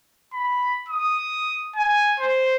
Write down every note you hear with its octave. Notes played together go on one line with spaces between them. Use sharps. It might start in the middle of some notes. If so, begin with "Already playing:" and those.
B5
D#6
G#5
C5